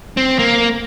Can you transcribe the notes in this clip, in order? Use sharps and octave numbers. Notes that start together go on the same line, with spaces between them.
C4
A#3